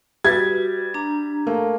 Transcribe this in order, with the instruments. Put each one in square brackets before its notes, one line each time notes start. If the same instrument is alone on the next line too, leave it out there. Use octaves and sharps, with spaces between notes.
[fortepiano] G3 [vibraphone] F#4 B4 [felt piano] E5 A6 [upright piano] G#6
[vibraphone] D4 A#5
[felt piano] A3 A#3